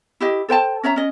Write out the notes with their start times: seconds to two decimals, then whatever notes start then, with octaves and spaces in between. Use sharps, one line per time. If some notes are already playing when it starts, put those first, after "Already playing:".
0.20 E4 G4 D#5
0.49 A4 C5 G5 A5
0.83 C#4 C#5 E5 A#5
0.96 C#4 D#5